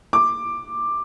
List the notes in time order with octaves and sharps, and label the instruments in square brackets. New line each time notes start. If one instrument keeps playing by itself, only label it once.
[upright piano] D6